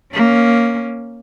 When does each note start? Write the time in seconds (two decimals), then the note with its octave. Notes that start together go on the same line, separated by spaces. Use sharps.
0.14 A#3 C#4